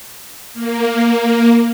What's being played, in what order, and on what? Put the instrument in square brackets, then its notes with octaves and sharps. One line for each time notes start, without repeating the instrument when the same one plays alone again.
[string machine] A#3